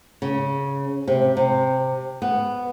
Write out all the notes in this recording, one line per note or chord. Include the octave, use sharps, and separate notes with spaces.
C#3
C3
C3
B3